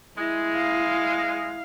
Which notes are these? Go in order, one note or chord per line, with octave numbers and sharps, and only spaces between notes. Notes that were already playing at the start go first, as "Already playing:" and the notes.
G#3 E4
F5